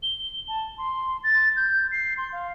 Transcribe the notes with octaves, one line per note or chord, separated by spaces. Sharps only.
G7
A5
C6
A6
G6
C7
C6
F5